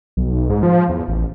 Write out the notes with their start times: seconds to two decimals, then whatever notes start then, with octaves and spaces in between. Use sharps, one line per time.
0.17 B1
0.50 G#2
0.63 F3
0.89 E2
1.08 A1